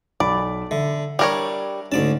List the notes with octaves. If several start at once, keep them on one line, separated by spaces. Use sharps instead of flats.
B1 D5 B5
D3 E5
G3 D4 A#4 C#5
D2 G#2 C#4 D5 A5